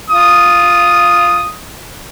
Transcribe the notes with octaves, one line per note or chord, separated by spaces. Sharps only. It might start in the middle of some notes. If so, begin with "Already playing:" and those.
F4 D#6